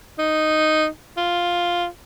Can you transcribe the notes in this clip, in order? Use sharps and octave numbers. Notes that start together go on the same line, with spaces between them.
D#4
F4